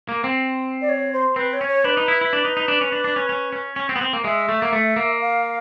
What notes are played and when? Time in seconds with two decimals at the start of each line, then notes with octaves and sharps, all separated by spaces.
0.09 A#3
0.24 C4
0.81 D5
0.89 C#5
1.13 C5
1.36 C4 B4
1.53 C#5
1.61 C#4
1.68 C#5
1.84 D4 B4
1.97 D#4
2.08 E4
2.21 E4
2.33 D4
2.45 D#4
2.57 D#4
2.68 D4
2.81 C#4
2.92 D4
3.04 D4
3.16 C#4
3.29 C#4
3.53 C#4
3.76 C#4
3.89 C4
3.96 B3
4.01 C4
4.13 A#3
4.24 G#3 E5
4.49 A3
4.62 A#3
4.73 A3
4.96 A#3
5.21 F5